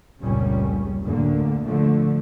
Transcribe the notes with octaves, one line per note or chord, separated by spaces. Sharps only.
F1 C#2 A#2 C#3 G3 C#4
D2 A2 D3 A#3
A2 D3 F3 A3